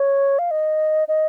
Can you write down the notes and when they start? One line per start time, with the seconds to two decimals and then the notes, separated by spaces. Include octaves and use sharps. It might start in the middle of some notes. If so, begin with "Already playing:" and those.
Already playing: C#5
0.39 F5
0.51 D#5
1.08 D#5